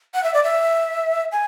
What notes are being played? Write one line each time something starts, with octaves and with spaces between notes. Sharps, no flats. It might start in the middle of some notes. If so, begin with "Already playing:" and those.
F#5
E5
D5
E5
G#5